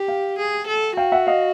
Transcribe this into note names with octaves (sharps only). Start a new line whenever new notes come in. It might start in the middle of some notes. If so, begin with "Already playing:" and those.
Already playing: G4
F5 G5
G#4
A4
F#4 F5 G5
E5 F#5
D#5 F5